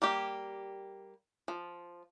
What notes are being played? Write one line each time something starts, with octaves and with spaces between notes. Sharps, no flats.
G3 A#3 G4
F3